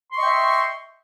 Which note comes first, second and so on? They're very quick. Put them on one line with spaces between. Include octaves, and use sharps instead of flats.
C6 C#6 D#5 G5 E5